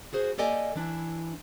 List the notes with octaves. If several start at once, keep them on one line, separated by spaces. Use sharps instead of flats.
F#4 G#4 C5
A#3 G4 A4 D5 D#5 G#5
E3 D4 E4